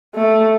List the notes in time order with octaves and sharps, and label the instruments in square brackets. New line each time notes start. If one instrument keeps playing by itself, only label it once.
[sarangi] A3